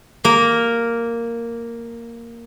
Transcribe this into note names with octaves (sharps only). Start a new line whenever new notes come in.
A#3 A#4